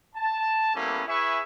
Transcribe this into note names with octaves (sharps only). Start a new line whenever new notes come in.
A5
G3 A#3 B3 C#4 E4 A4
E4 G#4 B4 E5 G#5 C#6